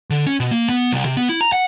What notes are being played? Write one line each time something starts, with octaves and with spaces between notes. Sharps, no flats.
D3
C#4
B2
A#3
B3
C2
C3
B3
E4
A#5
F#5